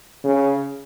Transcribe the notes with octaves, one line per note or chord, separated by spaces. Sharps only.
C#3